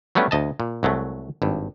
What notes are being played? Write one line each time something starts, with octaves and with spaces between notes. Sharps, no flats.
F#3 G3 A3 B3 C#4 D4
D2 D#5 A5
A#2
C2 F#3 G#3 A3
G#1 G2